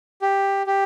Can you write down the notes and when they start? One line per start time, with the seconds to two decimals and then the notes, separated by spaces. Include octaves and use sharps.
0.22 G4
0.66 G4